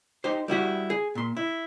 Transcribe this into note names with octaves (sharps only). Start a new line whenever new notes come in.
D#4 G4 C5
G3 E4 F#4 G4
G#4
A#2 C6
E4